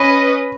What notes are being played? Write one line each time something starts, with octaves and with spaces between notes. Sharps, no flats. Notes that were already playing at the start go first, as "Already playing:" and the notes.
Already playing: C#4 B4 D#5 B5